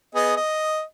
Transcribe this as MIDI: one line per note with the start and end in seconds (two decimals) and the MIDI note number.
0.15 0.35 59
0.15 0.35 68
0.15 0.35 75
0.37 0.82 75